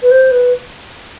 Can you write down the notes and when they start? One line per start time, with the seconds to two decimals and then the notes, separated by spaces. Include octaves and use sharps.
0.02 B4
0.11 C5
0.31 B4